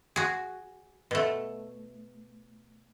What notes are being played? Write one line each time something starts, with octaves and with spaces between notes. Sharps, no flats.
F#4 G#4
B2 A3